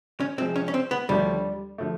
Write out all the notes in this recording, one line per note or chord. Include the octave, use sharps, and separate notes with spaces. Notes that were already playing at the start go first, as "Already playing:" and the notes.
C#4
C3 F3 G#3 C4
C#4
C#4
C4
B3
D#2 D3 F3 G3 A3
D3 F3 A3